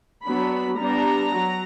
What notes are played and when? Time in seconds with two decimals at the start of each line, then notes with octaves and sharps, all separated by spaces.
0.24 F#3 B3 D4 B5
0.78 G3 B3 D4 A#5
1.32 F#3